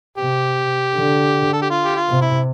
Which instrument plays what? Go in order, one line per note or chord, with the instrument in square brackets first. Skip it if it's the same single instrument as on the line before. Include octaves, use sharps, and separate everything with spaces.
[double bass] C3 [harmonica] G4
[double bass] D3
[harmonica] A4
G4
F4
G4
F4
[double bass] C3
[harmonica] E4